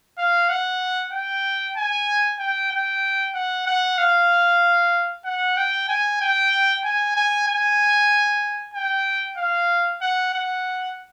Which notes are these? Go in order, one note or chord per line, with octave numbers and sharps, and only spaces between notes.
F5
F#5
G5
G#5
G5
G5
F#5
F#5
F5
F#5
G5
G#5
G5
G#5
G#5
G#5
G5
F5
F#5
F#5